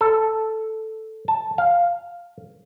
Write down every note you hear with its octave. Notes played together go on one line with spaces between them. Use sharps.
A4
A5
F5